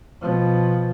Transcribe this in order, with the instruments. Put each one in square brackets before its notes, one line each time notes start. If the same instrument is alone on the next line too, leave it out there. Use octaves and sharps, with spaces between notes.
[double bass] B2 F3